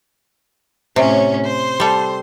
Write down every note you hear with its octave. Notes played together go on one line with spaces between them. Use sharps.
A2 C3 C#4 C#5
C5 C6
G3 A4